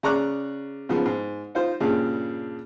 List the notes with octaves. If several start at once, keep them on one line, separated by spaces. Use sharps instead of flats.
C#3 D5 A#5 C#6 D6 F#6
G#2 C#3 F3 B3
G#2
D#4 F4 C5
G2 A#2 C#3